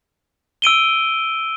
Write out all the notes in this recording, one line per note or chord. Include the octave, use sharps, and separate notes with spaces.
E6 D7 D#7 G7